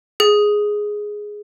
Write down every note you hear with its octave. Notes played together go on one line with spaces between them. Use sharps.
G#4